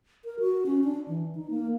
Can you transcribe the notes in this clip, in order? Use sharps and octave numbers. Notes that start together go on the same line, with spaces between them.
A#4
F#4
C#4
D4
E3
D#4
A#3